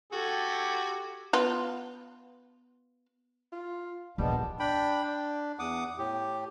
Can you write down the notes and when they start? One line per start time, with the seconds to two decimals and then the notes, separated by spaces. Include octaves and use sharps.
0.13 F#4 G4 A4 G#5
1.33 B3 F4
3.52 F4
4.18 A#1 D#2 G3 G#3 B3 D4
4.60 D4 G5 B5
5.03 D4
5.59 E2 F#5 D6 D#6
5.98 A2 G4